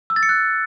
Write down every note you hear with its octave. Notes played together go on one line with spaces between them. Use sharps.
E6
A6
C#7
F#6